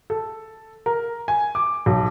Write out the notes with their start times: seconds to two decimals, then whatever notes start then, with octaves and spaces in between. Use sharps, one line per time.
0.10 A4
0.86 A#4
1.28 G#5
1.55 D6
1.86 B1